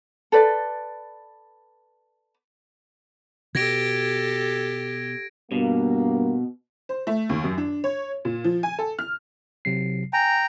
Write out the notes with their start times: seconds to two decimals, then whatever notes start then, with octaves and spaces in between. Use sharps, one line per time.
0.32 A4 B4 D5
3.55 B2 G4 A4 G#6 A#6 D7
5.52 G2 B2 A#3
6.89 C5
7.07 A3
7.29 D#2
7.44 F#2
7.58 D4
7.84 C#5
8.25 A#2
8.44 F3
8.63 G#5
8.79 A4
8.99 F6
9.65 C3 F#3 C7
10.13 G5 G#5 A#5